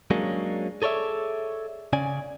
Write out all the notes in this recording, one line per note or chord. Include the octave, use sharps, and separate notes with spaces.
F#3 G#3 A#3 C#4 D4
G#4 A4 C#5 D5 E5
C#3 C#4 D5 G#5